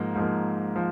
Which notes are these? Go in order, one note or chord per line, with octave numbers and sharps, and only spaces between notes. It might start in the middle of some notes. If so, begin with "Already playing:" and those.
Already playing: G#2 F3 A#3
G#2 F3 A#3
F3